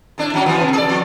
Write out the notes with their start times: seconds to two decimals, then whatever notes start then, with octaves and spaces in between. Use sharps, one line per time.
0.18 A2 A3 D4
0.32 A2 F#3 C#4
0.46 E3 F3 B3
0.61 C3
0.73 G#4 A4 D5
0.89 F3